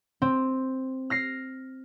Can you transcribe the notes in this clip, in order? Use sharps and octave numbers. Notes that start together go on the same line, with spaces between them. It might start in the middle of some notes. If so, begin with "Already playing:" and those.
C4
F6 A#6 C7